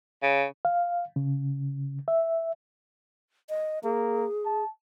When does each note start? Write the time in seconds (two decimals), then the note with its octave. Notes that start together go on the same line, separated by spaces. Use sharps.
0.22 C#3
0.65 F5
1.16 C#3
2.08 E5
3.49 D#5
3.84 A#3 G#4
4.45 A5